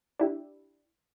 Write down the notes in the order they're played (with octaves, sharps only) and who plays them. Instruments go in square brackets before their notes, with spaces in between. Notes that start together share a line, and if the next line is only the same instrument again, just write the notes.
[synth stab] D4 E4 G4